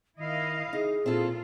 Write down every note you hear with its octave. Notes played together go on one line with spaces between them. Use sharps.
D#3 E4 D#5 F5
D#4 G#4
A#2 C4 E4 F4 A4